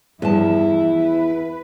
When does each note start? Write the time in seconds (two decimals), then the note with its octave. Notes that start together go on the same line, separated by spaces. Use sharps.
0.22 E2 G2 F3 E4 A5
0.60 E3
0.98 B4